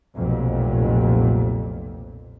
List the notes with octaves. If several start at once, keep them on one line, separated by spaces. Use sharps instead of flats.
F1 B1 F2 A#2